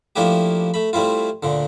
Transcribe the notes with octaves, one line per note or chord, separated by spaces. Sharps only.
F3 A3 A#3 D4 E4 G4
A3 B5
G3 A3 C4 E4 F4
D2 A#2 D3